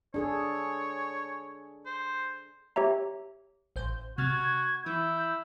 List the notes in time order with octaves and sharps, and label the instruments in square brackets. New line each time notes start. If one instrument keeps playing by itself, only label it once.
[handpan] D4 G#4 A4 [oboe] C#5
[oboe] C5
[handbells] G4 C#5 E5 A#5
[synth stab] A1 C5 G6
[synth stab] C3 F6 A6 [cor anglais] F#4 [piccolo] G#6
[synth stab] E3 [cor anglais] E4 [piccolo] G6